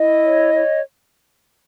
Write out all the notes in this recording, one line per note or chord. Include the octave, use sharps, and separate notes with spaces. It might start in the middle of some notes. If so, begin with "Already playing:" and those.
Already playing: E4 D#5
C#5
C#5